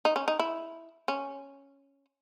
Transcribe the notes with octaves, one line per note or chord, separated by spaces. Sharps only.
D#4
C#4
D#4
E4
C#4